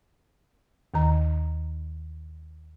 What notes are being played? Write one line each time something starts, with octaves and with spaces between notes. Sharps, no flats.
D#2 D#3 A#5